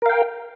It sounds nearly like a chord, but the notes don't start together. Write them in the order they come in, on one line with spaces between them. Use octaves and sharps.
A#4 F5 G5